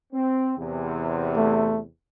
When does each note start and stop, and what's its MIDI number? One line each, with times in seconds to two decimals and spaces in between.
0.13 0.52 60
0.58 1.85 40
0.58 1.85 48
1.36 1.81 57